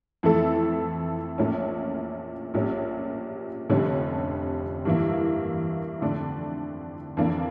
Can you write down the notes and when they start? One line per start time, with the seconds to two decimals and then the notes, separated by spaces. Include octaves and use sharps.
0.23 F2 E3 A3 E4 A4
1.38 A#1 A#2 A3 C#4
2.54 A#1 A#2 G3 C#4
3.70 F1 F2 D3 G3 C#4
4.85 G2 E3 A#3 E4
6.01 F2 D3 A3 D4
7.17 F2 E3 A#3 D4